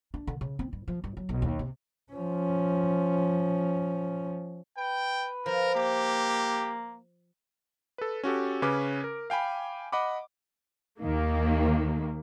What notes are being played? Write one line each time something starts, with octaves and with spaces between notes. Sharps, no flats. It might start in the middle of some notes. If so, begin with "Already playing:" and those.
D4
D3
C#3
C4
G2
F3
G2
F#3
B1
D#2
C3
F3 C#4
B4 G5
F3 A#4
A#3 G4
A4 B4
C#4 F#4 G4 A4
C#3 C#4 B4 D6
A#4
F5 G5 G#5 B5
D#5 F#5 B5 D6
D#2 D#3 A#3